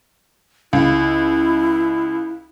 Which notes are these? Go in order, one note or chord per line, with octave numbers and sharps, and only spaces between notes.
C#2 E4